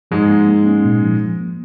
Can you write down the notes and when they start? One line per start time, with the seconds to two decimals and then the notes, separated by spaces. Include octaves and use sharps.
0.11 G#2 F3 G#3
0.29 A#3
0.48 A#3
0.67 C#4
0.85 A#2
1.03 F3
1.22 F3
1.40 A#3